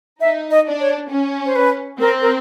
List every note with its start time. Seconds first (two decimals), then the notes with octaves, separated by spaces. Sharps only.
0.21 D#4 E5
0.51 D#5
0.66 D4
0.80 C#5
1.10 C#4
1.46 C5
1.56 B4
2.00 C4 A#4
2.22 A#4